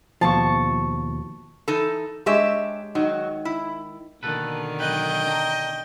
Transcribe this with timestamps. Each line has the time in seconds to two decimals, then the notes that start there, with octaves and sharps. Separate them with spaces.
0.21 D#2 B2 F3 A5 C#6
1.68 E3 D#4 A4
2.26 G#3 D4 G4 C#5 E5
2.95 D#3 F#3
3.45 E4
4.23 B2 D3 D#3 A#3 A4 B4
4.80 B1 E2 B4 D#5 G5
5.27 D4 A#5